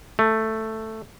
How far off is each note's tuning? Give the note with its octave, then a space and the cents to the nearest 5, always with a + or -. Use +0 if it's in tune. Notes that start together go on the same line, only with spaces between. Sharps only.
A3 +5